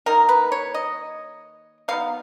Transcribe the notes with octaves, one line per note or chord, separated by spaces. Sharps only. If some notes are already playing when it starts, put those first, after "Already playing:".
D#3 A#3 D#4 A#4
B4
C#5
D#5
F#3 B3 D#4 F5